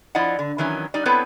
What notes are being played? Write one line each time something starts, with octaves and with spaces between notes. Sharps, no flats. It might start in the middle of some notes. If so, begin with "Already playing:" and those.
F3 E4 D5 D#5 F#5
D3
D#3 E3 F#3 C#4
G3 D#4 D5
B3 C4 E4 A4 B4 C#5